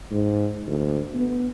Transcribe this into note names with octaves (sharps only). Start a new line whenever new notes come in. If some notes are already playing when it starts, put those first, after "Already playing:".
G#2
D2
B3